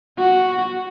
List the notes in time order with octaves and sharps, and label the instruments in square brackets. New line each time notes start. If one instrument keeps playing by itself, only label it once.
[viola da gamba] F#4